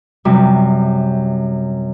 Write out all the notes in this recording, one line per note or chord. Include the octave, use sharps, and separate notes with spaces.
F#2 C3 G3